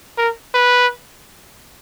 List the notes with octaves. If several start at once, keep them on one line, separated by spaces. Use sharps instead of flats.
A#4
B4